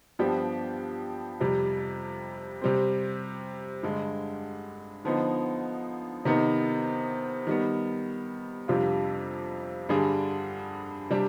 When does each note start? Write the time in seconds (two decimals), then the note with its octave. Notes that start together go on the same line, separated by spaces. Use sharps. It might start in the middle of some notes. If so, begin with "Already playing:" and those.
0.19 G2 F3 B3 D4 G4
1.40 F2 C3 G3
2.61 C3 G3 C4
3.83 G2 D3 G#3
5.05 D3 F3 B3 D#4
6.25 C3 D#3 B3 D#4
7.47 D#3 G3 B3
8.68 F2 C3 G3 D4 F4
9.89 G2 D3 G3 D4 G#4
11.10 C3 G3 D4